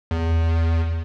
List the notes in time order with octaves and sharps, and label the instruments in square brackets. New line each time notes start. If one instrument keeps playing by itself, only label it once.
[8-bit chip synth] E2